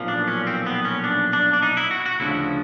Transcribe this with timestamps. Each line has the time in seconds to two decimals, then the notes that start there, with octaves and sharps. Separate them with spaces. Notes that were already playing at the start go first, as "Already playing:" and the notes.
Already playing: B1 A#2 F3
0.08 D4
0.28 C#4
0.47 C4
0.66 B3
0.85 C#4
1.04 D4
1.33 D4
1.53 D4
1.62 D#4
1.77 E4
1.91 F#4
2.06 F#4
2.20 D2 C#3 F3 E4